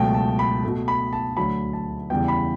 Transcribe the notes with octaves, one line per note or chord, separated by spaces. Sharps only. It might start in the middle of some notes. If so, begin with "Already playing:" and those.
Already playing: C#2 B2 F#3 A3 G5
A5
B5
B2 A3
B5
A5
D2 D3 F#3 B5
A5
E2 C#3 E3 G3 B3 G5
B5